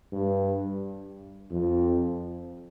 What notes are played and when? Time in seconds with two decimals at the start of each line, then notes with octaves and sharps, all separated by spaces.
0.12 G2
1.51 F2